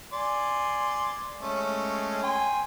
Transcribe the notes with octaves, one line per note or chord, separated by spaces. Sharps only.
D5 G#5 C6
G#3 A3 C#4
G5 G#5 C6